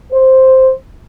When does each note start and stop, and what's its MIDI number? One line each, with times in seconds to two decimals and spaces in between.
0.12 0.71 72